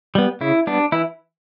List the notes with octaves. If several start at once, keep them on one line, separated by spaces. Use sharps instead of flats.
G3 B3
C#3 E4
G3 B3 D4
E3 E4